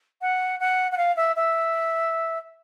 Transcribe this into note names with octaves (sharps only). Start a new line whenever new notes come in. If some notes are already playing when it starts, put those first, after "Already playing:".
F#5
F#5
F#5
F5
E5
E5